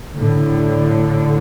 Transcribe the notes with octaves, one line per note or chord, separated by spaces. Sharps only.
A2 D3